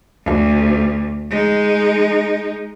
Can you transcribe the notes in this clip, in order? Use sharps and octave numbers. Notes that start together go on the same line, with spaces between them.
D2
G#3 D#4